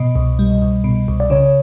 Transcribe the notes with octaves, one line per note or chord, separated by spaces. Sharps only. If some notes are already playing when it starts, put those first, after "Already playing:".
Already playing: B2 D#5
C2
G3
C2
B2
C2
D5
C#3 C#5